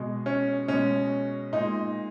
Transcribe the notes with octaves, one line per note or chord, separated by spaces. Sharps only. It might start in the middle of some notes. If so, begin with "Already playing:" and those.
Already playing: B2 G#3
C#4
B2 G#3 C#4
A#2 G#3 D#4